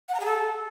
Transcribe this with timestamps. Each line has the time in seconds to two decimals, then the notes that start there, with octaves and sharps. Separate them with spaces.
0.09 F#5
0.14 A#5
0.20 G#4
0.25 A4